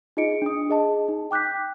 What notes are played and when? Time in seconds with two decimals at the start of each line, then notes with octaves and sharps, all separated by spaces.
0.17 D#4 F4 G#4 D#5 C#7 D7
0.42 D4 D#6
0.69 G#4 D#5 A5
1.08 D#4
1.31 G5 D6 F#6 G6 B6